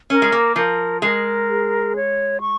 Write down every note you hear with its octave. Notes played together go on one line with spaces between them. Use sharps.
C#4 A#4
G#3
A#3
F3 A#4
G#3 A#4
G#4
C#5
C#6